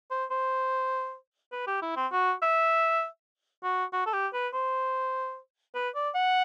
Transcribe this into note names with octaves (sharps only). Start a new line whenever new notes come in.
C5
C5
B4
G4
E4
C4
F#4
E5
F#4
F#4
A4
G4
B4
C5
B4
D5
F#5